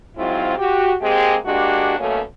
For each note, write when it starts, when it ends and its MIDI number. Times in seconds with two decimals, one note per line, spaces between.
0.17 0.54 44
0.17 0.54 54
0.17 0.54 60
0.17 0.54 64
0.17 0.54 65
0.58 0.92 66
0.58 0.92 67
1.02 1.36 56
1.02 1.36 58
1.02 1.36 60
1.02 1.36 67
1.02 1.36 68
1.46 1.97 56
1.46 1.97 58
1.46 1.97 62
1.46 1.97 66
1.46 1.97 67
1.98 2.20 42
1.98 2.20 47
1.98 2.20 57
1.98 2.20 58
1.98 2.20 61